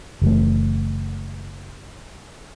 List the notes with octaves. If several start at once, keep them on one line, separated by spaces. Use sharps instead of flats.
F#1 E3 A3